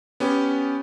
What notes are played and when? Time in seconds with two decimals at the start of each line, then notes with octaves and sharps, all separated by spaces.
0.20 B3 C#4 G4